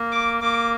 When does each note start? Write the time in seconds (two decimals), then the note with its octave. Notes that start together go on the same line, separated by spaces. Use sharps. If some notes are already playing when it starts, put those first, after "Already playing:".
Already playing: A#3
0.12 D6
0.42 A#3 D6